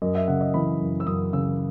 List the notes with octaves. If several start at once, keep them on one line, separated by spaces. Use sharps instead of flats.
F#2 D#5
E5
C#3 F#5
D#5
E3 B5
F#2
E6
F#2 D#6
C#3 E6